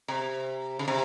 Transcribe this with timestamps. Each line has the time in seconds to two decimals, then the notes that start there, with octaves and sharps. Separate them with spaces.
0.08 C3
0.79 C#3
0.88 C3